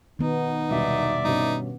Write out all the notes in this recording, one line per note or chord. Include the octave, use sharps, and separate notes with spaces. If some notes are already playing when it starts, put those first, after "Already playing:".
D#3 B3 D#4
E1 C2 D5 E5
G2 B2 C#4 D#4